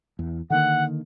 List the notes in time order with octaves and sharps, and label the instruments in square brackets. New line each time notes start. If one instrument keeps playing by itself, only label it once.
[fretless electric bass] E2
[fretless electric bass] D3 D#3 A#3 [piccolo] F#5